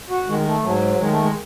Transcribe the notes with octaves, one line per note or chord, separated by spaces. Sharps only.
F#4
D#3 G#3
G#3
A3
G#2 F#3
D#3 G#3
A3
G#3